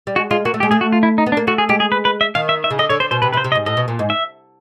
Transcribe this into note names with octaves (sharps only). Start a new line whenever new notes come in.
G3
G#3 F#4
G#3 F4
A#3 F#4
A3
G#3 G4
A3 G#4
F#4
F4
E4
D#4
B3
D4
A#3
A3 F#4
G#4
G#3 G4
G#4
B4
B4
E5
D#3 F5
E5
E5
C#3
D3 D#5
D3 C#5
D3 C5
B2 C5
C3 B4
C3 B4
C5
C3
D#5
G#2
A2 D#5
B2
A#2
G#2
E5